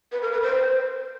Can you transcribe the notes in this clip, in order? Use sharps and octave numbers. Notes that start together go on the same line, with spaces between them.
B4
A#4
B4
C5